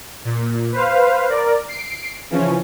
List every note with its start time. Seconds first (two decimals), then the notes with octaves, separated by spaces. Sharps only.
0.25 A#2
0.73 B4 C5 F5
1.29 A#4 D5
1.68 C7 D7
2.30 C#3 E3 F3 C#4